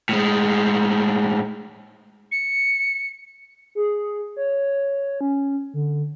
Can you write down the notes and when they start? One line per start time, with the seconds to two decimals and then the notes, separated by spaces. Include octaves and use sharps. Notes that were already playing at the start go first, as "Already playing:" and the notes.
0.09 A2 G#3
2.32 C#7
3.75 G#4
4.37 C#5
5.21 C#4
5.74 D3